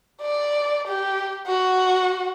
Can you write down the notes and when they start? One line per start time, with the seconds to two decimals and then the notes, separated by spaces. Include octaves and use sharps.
0.22 D5
0.88 G4
1.47 F#4